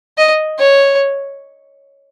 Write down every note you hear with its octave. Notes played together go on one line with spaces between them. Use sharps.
D#5
C#5